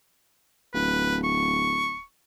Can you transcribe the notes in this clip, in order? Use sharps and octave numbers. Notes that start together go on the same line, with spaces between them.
D1 B4
C#6